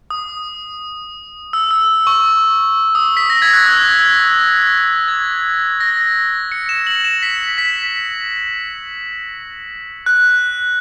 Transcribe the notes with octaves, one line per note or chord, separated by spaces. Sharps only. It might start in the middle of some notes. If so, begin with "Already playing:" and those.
D#6
E6
E6
C#6
D#6
B6
A#6
G#6
F#6
E6
G#6
A#6
C#7
E7
F#7
E7
B6
B6
F#6